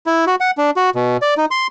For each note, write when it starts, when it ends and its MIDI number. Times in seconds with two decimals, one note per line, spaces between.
0.06 0.25 64
0.27 0.35 66
0.40 0.51 78
0.58 0.71 62
0.76 0.90 66
0.95 1.17 47
1.22 1.34 74
1.37 1.45 63
1.51 1.67 84